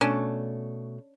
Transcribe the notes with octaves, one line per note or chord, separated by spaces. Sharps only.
B2 A3 C#4 D4